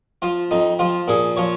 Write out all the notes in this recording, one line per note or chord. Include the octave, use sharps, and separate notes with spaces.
F3 F4
F2 D#4
F3 F4
A#2 G#4
F3 C#5